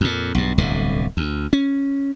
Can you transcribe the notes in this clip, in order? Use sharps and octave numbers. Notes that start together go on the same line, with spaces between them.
F2 A#2
B1 G2
D1 C2 B2 D3
D2
C#4